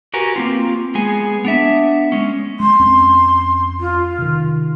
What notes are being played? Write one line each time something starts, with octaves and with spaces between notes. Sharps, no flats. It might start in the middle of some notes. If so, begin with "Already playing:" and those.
F#4 G4 A#4 B4 G#5
A#3 C4 F4
G#3 B3 G#4 G#5
B3 D4 E5
G#3 C#4
G#3 C6
F2 C4 C#4
F4
C3 D#3